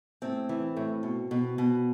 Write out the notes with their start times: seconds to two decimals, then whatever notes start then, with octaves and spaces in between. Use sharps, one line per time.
0.22 A2 C4
0.49 E3
0.77 A2
1.03 B2
1.31 B2
1.58 B2